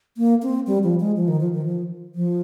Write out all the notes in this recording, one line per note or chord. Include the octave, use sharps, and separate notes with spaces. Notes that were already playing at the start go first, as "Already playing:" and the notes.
A#3
C4
G3
F3
G#3
F3
D#3
F3
D#3
F3
F3